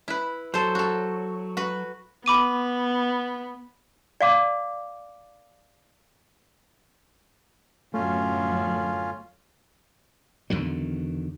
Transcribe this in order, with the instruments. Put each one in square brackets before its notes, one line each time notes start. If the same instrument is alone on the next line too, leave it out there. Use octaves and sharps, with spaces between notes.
[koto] E4 B4
[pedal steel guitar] F#3 [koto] A4 C5
[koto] F#4 A4
F#4 B4
[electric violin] B3 [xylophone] B5 D6 D#7
[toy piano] D5 F5 D6
[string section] F#2 [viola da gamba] A2 D3 B3 [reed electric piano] A3 [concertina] C#4 F4
[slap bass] E2 D3 D#3 F#3